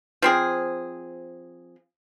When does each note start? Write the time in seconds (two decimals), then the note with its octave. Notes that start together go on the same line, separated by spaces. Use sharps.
0.22 F3 C4 G#4